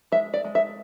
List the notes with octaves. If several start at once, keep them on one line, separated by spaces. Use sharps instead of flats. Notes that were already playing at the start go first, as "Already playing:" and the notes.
G#3 E5
D5
G#3
E5